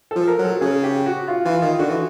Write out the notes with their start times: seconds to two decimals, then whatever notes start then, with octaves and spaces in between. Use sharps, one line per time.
0.11 F3 A4
0.28 A#4
0.39 F#3
0.45 A4
0.61 C#3 G#4
0.83 G4
1.06 F#4
1.28 F4
1.45 E3 F4
1.62 D#3 F4
1.79 D3 F#4
1.90 E3